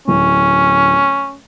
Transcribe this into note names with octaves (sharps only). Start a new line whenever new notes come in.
D1 C#4